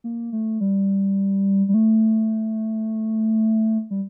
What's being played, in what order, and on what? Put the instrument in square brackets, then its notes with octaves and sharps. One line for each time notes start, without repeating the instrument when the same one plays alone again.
[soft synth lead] A#3
A3
G3
G3
A3
G3